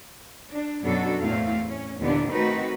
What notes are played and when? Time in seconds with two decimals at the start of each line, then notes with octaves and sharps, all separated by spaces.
0.51 D4
0.84 F#2 B2 F#3 D4 F#4 A4
1.20 E2 A2 A3 C4 E4 F5
1.68 C#4
2.00 D#2 A#2 D3 E3 B3 D4
2.31 D#3 A3 C4 D#4 F#4 B4